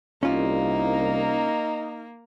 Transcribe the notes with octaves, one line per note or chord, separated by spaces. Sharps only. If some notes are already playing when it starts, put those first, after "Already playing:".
C2 A#3 C#4 D#4 F4